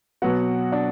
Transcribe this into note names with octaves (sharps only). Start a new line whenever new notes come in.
B2 F#3 B3 F#4 F#5
D4 D5